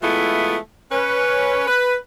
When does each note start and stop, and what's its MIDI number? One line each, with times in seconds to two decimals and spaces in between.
0.02 0.56 52
0.02 0.56 56
0.02 0.56 57
0.02 0.56 59
0.02 0.56 64
0.02 0.56 65
0.92 1.64 61
0.92 1.64 71
1.67 1.95 71